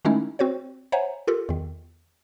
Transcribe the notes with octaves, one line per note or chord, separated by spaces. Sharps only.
D#3 G#3 A3 C#4 D#4 E4
C4 F#4 C5 C#5
C5 C#5 E5 F#5 G#5 A#5
F4 G4 A4 A#4
E2 D#3